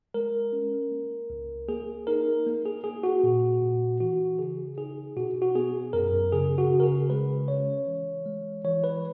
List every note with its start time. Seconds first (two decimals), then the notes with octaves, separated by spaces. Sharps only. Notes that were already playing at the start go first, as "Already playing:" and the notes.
0.14 G#3 A#4
0.53 C#4
0.91 A#3
1.30 C#2
1.69 A#3 G#4
2.07 D#4 A#4
2.46 A#3
2.66 G#4
2.84 A#3 G#4
3.03 F#4
3.23 A#2
3.62 A#2
4.00 E3 F#4
4.39 C#3 G#4
4.78 D#4 G#4
5.16 B2 F#4
5.42 F#4
5.55 B3 G#4
5.93 F#2 A#4
6.32 C#3 G#4
6.58 F#4
6.71 C#3
6.80 A#4
6.83 G#4
7.10 G#3 B4
7.48 C#4 C#5
7.87 E3
8.26 G#3
8.65 E3 C#5
8.84 B4